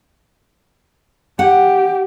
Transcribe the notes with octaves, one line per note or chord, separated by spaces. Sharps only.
G4 F#5